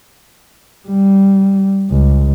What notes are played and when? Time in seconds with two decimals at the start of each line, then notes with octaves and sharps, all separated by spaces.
0.89 G3
1.91 C#2